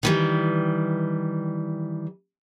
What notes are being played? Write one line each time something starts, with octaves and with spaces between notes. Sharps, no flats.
D#3 E3 G3